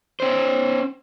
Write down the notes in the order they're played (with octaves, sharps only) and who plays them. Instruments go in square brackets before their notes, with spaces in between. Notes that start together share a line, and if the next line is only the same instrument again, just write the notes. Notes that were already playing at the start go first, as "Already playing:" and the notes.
[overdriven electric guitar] C#4 C5